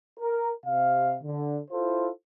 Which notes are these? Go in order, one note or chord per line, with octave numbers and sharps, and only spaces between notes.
A#4
C3 F5
D3
E4 F4 A4 C5